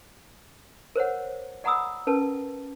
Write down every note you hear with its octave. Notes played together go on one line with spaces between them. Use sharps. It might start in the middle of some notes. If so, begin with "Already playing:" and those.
A#4 C5 C#5 F#5
D5 F#5 A#5 B5 D#6 E6
C#4 A#4 B4 A5